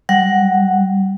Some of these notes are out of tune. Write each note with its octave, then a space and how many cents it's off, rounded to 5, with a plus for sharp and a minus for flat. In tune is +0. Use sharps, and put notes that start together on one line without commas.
G3 -20 F#5 +0